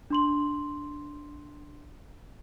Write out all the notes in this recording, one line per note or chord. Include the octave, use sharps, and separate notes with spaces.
D4 C6 F#7